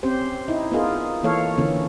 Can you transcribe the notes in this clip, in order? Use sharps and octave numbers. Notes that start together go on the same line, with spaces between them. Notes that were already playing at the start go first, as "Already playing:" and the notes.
C4 C#4 G4 C5
D#4 E4
B3 D#4 F4 G#4 A#4
E3 A#3 A4 C#5 F5
D3 E3 A#3 C#4